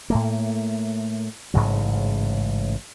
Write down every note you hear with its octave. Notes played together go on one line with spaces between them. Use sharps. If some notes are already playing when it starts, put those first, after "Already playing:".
A2 A3 A#3
A1 G#2 C#3 F#3